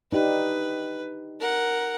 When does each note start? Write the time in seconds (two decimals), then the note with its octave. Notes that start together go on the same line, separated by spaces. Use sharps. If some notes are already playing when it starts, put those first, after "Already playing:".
0.13 D4 D#4 G4 B4
1.40 A#4 F#5